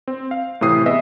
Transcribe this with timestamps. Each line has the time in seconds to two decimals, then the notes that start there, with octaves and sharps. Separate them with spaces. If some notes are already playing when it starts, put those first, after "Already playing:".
0.08 C4
0.31 F5
0.61 A2 C3 E3 D#6 C7
0.86 B3 G#4 D#5 E5